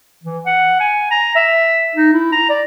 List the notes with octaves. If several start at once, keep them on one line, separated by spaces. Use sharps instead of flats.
E3
F#5
G#5
A#5
E5
D#4
E4
A#5
D5